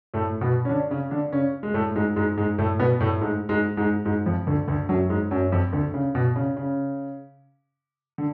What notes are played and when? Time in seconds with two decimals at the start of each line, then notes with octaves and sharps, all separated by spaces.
0.14 A2 A3
0.41 B2 B3
0.65 C#4
0.69 D3 D4
0.90 C#3 C#4
1.11 D3 D4
1.32 C#3 C#4
1.63 G#3
1.74 A2 A3
1.95 G#2 G#3
2.16 G#2 G#3
2.37 G#2 G#3
2.58 A2 A3
2.79 B2 B3
3.00 A2 A3
3.15 A3
3.21 G#2 G#3
3.49 G#2 G#3
3.77 G#2 G#3
4.05 G#2 G#3
4.26 F2 F3
4.47 D2 D3
4.68 D2 D3
4.89 F#2 F#3
5.10 G#2 G#3
5.31 F#2 F#3
5.52 F2 F3
5.73 D2 D3
5.94 C#3
6.15 B2
6.36 C#3
6.57 C#3
8.18 D3